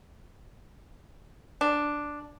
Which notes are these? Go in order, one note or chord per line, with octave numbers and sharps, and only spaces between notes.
D4